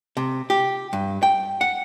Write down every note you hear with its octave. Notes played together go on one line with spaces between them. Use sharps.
C3
G4
G2
G5
F#5